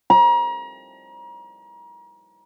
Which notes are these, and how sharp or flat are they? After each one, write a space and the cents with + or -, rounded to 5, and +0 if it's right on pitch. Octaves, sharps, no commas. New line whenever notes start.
A#5 +35